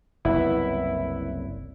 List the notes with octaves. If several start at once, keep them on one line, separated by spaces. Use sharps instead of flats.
F#1 C2 B3 E4